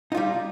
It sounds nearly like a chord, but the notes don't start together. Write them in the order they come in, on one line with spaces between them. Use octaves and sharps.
D#4 F4 G3